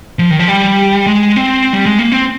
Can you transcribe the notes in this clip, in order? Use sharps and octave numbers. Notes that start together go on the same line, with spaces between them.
F3
D#3
F3
G3
G#3
C4
G3
G#3
A#3
C4